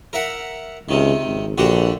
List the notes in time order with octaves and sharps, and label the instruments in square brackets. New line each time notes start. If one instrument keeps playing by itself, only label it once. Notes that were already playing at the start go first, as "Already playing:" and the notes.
[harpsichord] A#4 E5 F#5
[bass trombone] C#2 [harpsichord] C3 D#3
[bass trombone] G#1
[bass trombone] A#1 [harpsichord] D3 F#4 G4